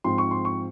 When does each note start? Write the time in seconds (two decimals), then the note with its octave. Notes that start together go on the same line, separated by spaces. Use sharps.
0.04 G#2 F3 C4 C6
0.18 C#6
0.31 C6
0.45 C#6